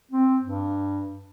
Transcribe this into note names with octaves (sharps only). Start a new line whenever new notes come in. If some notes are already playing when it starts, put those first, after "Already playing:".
C4
G2